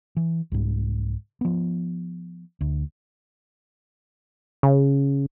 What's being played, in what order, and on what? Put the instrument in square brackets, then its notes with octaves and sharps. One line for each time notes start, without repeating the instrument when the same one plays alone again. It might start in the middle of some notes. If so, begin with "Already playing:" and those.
[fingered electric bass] E3
C2 G#2
F3 B3
D2
[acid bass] C#3